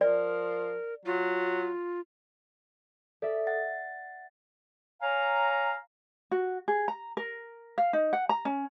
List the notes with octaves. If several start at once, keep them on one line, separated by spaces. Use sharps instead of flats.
F3 A#4 D5
F#3 F4
A4 D5 E5
F#5 A6
C#5 F5 G#5 A#5
F#4
G#4
A#5
A#4
F5
D#4
F#5
A#5
C#4